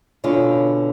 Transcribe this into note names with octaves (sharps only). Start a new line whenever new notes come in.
B2 D3 C#4 F4